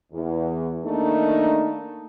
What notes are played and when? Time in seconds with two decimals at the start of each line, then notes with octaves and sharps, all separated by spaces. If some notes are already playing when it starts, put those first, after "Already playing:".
0.13 E2
0.85 D#3 A3 A#3 D4 D#4